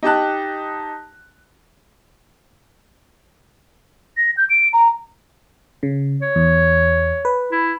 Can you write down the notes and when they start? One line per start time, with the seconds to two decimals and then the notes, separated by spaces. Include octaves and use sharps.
0.03 D#4 G4 A5 F#6
4.17 A#6
4.37 G6
4.50 D7
4.73 A#5
5.83 C#3
6.22 C#5
6.36 E2
7.25 B4
7.52 E4